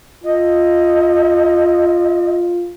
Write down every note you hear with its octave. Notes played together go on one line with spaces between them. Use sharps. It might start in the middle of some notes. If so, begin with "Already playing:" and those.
F4 D#5